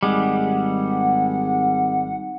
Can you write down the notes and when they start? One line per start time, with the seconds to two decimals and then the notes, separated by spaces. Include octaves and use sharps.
0.03 G#1 G3 G#3 F#5